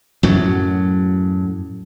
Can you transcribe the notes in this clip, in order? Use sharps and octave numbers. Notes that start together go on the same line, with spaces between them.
F#2 A2 F#3